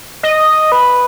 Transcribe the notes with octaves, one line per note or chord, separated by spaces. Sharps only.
D#5
B4